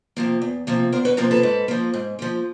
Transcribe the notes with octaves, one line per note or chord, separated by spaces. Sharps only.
C3 F3 A#3
E2
C3 F3 A#3
E2 A#4 C5
B4 C#5
C3 F3 A#3 A#4 C5
A4 B4
G#2
F3 A#3
G#2
F3 A#3